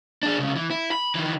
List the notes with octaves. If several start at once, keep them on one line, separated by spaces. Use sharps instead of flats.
D4 G#4
C2 C#3
E3
E4
B5
D#3 E3